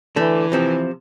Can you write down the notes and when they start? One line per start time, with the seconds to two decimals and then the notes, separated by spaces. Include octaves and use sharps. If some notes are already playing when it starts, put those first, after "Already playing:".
0.16 D3 E3 A3
0.52 C3 F3 C4